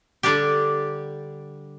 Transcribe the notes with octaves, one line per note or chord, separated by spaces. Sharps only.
D3 G3 D4 G4